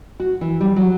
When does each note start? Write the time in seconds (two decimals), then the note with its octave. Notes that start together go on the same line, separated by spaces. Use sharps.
0.20 F#4
0.41 E3
0.61 G3
0.76 F#3